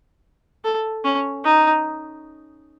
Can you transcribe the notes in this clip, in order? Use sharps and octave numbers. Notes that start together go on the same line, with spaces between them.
A4
C#4
D#4